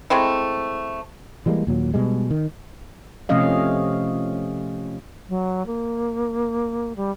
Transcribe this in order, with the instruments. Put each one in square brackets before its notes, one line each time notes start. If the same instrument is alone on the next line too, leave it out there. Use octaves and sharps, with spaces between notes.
[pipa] G#3 A3 C4 E4
[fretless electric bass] E3 G3 G#3 A#3
D#2 A#2 F#3
B2 G3 G#3
D#3
[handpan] C3 F3 A3 C#4 D#5 F5
[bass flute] F#3
A#3
G3